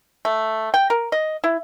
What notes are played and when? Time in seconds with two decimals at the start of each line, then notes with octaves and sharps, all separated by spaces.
0.25 A3
0.74 G5
0.90 A#4
1.12 D#5
1.44 E4